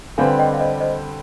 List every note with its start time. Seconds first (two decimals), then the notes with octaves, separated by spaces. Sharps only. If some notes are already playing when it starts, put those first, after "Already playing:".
0.18 D3 G3 C4 G4 B4 F5 G#5
0.39 D#5 G5
0.53 F5
0.60 C5 D#5
0.80 C5 D#5